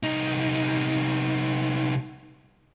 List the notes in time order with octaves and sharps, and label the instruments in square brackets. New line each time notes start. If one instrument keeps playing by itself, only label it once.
[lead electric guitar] C2 D#4